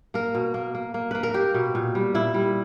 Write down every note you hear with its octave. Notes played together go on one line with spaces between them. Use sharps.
A#3 A#4
B2
A#3
A#3
A#3
A#3 B4
A#4
A#3 G4
B2
A#2
G3
A#2 E4
G3